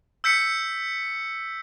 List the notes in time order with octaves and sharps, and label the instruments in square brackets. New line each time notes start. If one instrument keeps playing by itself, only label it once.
[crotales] E6 G6 B6 C#7